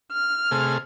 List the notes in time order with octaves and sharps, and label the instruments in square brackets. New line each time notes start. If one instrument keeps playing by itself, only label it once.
[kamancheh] F6
[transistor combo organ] C3 A3 G#4